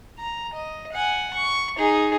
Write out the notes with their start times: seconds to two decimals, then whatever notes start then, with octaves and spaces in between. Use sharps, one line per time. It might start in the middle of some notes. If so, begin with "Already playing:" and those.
0.19 A#5
0.53 D#5
0.93 F#5 G#5
1.34 C#6
1.78 D#4 G#4